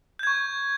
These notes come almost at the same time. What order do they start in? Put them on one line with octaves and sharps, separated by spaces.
G6 G#6 C#6